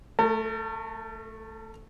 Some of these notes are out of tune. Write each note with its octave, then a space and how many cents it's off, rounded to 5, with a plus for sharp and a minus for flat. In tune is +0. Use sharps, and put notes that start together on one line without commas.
A3 +0 A#4 -45